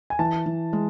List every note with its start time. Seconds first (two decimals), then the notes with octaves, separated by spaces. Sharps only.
0.10 G#5
0.19 E3 A5
0.46 E3
0.73 G#3